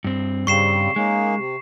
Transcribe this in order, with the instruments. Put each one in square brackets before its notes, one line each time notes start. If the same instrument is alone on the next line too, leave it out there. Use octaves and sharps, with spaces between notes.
[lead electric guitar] G2 C4
[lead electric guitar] G2 [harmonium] C#3 G3 C4 [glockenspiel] C#6 C7 E7
[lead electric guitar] G#3 [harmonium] A#3 C#4 D#4
[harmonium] C3